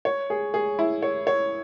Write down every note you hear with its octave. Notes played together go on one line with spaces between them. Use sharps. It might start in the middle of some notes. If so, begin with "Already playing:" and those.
C#5
G#4
G#4
E4
C#5
C#5